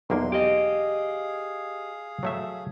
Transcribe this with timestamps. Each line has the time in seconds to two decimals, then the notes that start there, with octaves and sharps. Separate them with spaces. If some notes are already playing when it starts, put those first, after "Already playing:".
0.10 B1 E2 A#3 C6
0.32 G4 G#4 D#5 F5
2.23 F#3 A3 E5